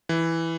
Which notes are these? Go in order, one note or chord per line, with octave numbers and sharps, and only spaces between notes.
E3